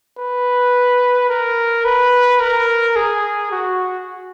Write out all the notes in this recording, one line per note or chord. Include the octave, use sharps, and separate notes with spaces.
B4
A#4
B4
A#4
G#4
F#4